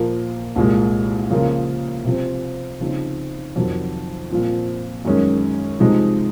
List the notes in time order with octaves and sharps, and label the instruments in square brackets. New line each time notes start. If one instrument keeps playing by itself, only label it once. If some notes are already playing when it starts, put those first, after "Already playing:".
Already playing: [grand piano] A#2 F3 A#3
C2 A#2 G#3
C#3 F3 A#3 F4
C3 F3 C4
C#3 F3 C4 D#4
F2 C3 D#3 F#3
A#2 F3 C4
F#2 D#3 G#3 C#4
C3 F3 G#3 D#4